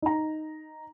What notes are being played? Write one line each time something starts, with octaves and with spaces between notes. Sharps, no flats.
D#4 A#5